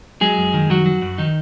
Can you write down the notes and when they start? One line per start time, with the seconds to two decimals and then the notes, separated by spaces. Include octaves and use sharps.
0.21 F#3 G#3 G#4
0.37 F#2
0.54 D#3
0.70 F#2 F#3 F#4
0.86 F#3
1.02 F#2
1.18 D#3 D#4